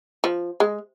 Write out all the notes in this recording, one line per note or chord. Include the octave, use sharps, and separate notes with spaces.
F3
G#3